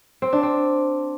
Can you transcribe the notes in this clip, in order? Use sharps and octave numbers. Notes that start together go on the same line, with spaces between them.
C4
D4
C4